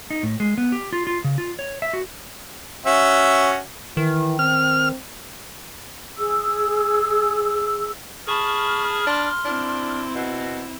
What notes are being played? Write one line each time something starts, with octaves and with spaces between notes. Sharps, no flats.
D#4
A2
G#3
B3
G4
F4
F4
C#3
F4
C#5
E5
F#4
C#4 F#4 E5
D#3 E3
C4 F6
G#4 E6
G#4 A5 B5 C#6 F6
D4 C6
C4 D4 E4
B2